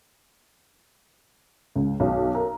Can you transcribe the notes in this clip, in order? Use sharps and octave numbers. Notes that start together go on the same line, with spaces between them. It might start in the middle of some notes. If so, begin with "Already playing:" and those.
C#2
B1
A#4